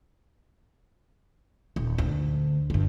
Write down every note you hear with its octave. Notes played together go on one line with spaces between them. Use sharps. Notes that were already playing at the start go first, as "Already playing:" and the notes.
D#1
D2
G2 D3